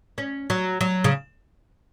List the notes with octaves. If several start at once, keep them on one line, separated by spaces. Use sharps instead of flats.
C#4
F#3
F#3
C#3